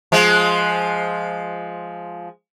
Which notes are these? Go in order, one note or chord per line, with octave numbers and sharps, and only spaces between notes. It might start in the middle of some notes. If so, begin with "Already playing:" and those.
F3 G#3